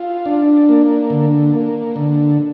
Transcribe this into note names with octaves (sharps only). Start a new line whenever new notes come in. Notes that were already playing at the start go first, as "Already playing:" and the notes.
Already playing: F4
D4
A#3
D3
A#3
D3